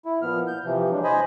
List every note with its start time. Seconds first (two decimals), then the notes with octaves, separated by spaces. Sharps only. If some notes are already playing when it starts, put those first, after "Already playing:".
0.05 E4
0.22 A#2 F3 B3 F6
0.48 G6
0.64 C3 E3 F3
0.91 F#3 G#3 D4
1.04 C5 D#5 G#5 B5